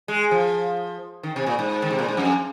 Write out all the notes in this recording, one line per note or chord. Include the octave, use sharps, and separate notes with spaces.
G#3
F3
D#3
C3
A#2
G#2
D#3
C3
A#2
G#2
F2